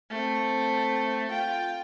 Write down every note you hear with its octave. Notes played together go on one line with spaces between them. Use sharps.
A3 C4
F4 G5